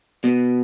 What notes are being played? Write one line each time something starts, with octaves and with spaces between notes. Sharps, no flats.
B2